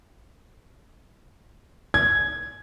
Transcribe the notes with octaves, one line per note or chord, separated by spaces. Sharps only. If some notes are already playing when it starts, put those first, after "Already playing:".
G#6